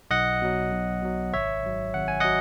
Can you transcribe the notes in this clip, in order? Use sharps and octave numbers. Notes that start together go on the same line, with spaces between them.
B1 D#5 F#5
B2 F#3
B1
B2 F#3
G#1 C#5 E5
G#2 F#3
G#1 F#5
G#5
F#3 D#5 F#5